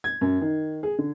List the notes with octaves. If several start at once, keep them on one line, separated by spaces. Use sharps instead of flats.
G#6
F#2
D#3
G#4
D3